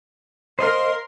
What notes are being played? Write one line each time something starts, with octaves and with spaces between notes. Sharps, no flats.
A#4 C5 D#5 F5 C6